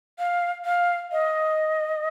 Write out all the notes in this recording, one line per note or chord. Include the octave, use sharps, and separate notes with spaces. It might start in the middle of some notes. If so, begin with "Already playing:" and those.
F5
F5
D#5